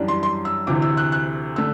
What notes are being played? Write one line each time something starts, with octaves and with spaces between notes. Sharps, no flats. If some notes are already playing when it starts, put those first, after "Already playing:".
Already playing: F#2 E3 G3 D4
C6
C6
E6
D2 C3 E3 D6
E6
F#6
F#6
D3 A3 E6